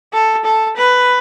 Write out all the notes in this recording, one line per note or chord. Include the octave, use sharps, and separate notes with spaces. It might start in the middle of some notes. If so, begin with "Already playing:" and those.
A4
A4
B4